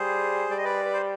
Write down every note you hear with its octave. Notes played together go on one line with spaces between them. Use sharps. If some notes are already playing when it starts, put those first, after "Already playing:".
Already playing: G3 G#4 C5
G3 D5
D#5
B4 D5
B4
C5